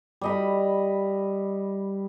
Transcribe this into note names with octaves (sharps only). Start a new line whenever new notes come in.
G3 D#5 B5